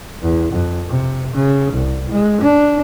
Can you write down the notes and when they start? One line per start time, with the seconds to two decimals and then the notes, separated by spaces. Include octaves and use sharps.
0.23 E2
0.53 F2
0.89 C3
1.34 C#3
1.74 C2
2.11 G#3
2.42 D4